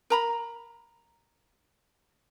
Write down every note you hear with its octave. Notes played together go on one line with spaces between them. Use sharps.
A#4 A#5 B5